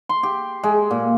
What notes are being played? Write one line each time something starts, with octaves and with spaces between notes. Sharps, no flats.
C6
G4
G#3
A#2